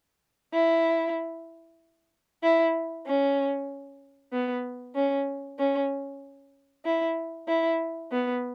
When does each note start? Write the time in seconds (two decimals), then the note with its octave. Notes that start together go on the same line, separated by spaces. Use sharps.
0.53 E4
2.43 E4
3.06 C#4
4.32 B3
4.95 C#4
5.59 C#4
6.85 E4
7.48 E4
8.11 B3